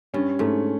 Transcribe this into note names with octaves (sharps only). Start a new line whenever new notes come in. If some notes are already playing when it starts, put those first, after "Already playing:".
G2 C#4
G#2 A3